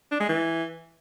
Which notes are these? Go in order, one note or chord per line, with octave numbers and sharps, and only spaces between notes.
D4
G#3
E3